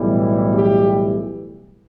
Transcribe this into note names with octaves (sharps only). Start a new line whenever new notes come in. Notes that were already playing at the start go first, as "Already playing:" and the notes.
Already playing: B1 A2 E3 G3
G4